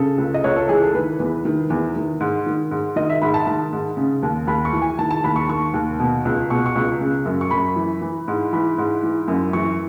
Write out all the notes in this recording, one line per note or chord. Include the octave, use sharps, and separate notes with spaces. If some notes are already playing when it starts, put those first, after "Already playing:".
Already playing: C#3 A4
C#2
D#5
C#2 C#5
A4
E3 G#4
A4
D#3 B4
E2
D#3
E2
D#3
G#2
D#3
G#2
D#3 D#5
E5
G#2 B5
A5
D#3 A5
G#2
C#3
D#2
D#2 B5
C#6
E3
G#5
D#3 A5
A5
D#2 B5
C#6
D#3 C#6
D#2
B2
C#2
B2 C#6
C#6
C#2
C#3
F#2
C#6
F#2 B5
E3
E3
G#2
E3 B5
G#2
E3
F#2
E3 C#6